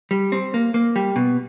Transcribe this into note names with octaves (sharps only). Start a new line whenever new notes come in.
G3
C4
A#3
A#3
G3
B2